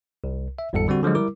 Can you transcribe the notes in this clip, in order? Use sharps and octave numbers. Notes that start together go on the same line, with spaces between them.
C2
E5
G1 E2 G#2 G3 A4 C#7
D3 G3 C4 F#4
D3 F3 F#3 G#3
G3 E4 A#4 D6